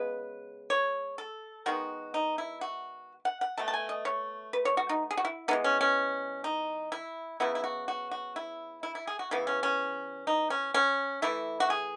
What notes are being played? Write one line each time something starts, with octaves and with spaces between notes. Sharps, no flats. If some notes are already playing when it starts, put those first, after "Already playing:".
Already playing: C#3 G#3 B3 B4
C#5
A4
D#3 G#3 B3 F#4
D#4
E4
F#4
F#5
F#5
B2 A3 A5
A5
G#5
D#5
C#5
B4
C#5
F#4
D#4
G#4
F#4
E4
E3 G#3 B3 D#4
C#4
C#4
D#4
E4
C#3 F#3 B3 E4
E4
F#4
F#4
F#4
E4
E4
E4
G#4
F#4
C#3 E3 B3 E4
C#4
C#4
D#4
C#4
C#4
E3 A3 E4
F#4
G#4